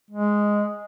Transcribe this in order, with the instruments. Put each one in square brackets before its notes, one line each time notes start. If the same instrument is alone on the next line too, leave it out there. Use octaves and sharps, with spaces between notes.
[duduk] G#3